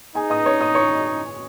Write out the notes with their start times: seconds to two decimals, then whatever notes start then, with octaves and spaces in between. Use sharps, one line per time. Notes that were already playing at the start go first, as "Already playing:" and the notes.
0.15 D#4 G#4 G#5
0.30 D#5 D#6
0.46 C#5 C#6
0.61 D#5 D#6
0.75 C#5 C#6